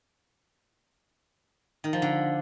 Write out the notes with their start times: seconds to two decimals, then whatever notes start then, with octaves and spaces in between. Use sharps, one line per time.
1.84 D#3
1.93 F3
2.02 D3